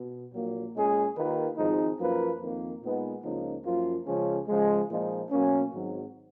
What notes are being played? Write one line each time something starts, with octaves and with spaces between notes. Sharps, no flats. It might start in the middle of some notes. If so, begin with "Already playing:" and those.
Already playing: B2
A#1 A#2 F#3 A#3
A#2 G#3 C#4 G#4
D#2 D#3 A#3 F4 B4
G#1 G#2 F3 G#3 D#4
F#2 F3 A#3 F4 B4
F2 D#3 A#3
A#2 G#3 B3 D#4
C#2 C#3 F3 A#3 D#4
F#2 F3 A#3 F4
C#2 C#3 F3 G#3 C#4
C#3 F3 G#3
A#2 F3 G#3 D#4
B2 F#3 A#3 C#4
G#1 G#2 F#3